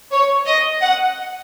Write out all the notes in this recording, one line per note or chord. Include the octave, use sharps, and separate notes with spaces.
C#5
D#5
F#5